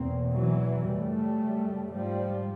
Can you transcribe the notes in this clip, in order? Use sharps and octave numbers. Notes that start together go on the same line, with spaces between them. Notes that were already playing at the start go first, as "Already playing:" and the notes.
Already playing: E2 B2 A#3 C4
E3 F#3
F#2 C#3 G3 A3
G#2 F3 G3